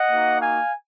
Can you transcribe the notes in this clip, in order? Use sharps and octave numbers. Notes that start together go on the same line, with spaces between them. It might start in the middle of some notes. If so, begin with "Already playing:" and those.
Already playing: D#5 F#5
A#3 D#4 F#4
F5 G#5